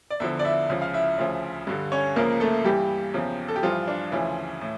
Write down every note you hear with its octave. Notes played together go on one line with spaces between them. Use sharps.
D5
E2 D3 F3 E4 E5
D5
E4 E5
C#2 C#3 F3
F5
E4 E5
D2 C#3 F3
G2 D3 G3
C#4 C#5
C#2 C#3 F3 A#3 A#4
A3 A4
G2 E3 G3 G4
E2 C#3 F3
A4
G4
G2 E3 F3 G3 F4
D4
D2 C#3 E3 F3 E4
A2